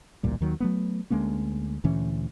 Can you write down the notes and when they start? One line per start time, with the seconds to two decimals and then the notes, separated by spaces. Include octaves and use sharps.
0.23 A1 D2 A#2 G3
0.40 D#2 D#3 F#3
0.60 F#3 A3 B3
1.10 D2 G#3 A#3 C#4
1.84 D2 A#2 E3 C#4